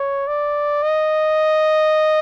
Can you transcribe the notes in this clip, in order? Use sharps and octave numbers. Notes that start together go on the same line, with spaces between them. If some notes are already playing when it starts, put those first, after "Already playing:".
Already playing: C#5
D5
D#5